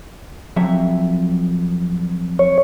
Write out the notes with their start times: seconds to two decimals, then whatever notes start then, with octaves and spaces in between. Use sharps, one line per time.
0.56 F2 F#3 E5
2.39 C#5